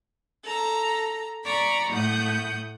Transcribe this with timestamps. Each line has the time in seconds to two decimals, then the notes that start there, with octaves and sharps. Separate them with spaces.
0.45 A4 A#5
1.44 D5 A#5 B5 C#6
1.91 A2 A3 F#5 D#6 G6